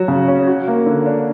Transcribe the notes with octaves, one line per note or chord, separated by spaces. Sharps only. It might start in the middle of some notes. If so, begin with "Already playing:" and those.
Already playing: F#3 F#4
C#3
C#4
F#4
A#3
D3
D4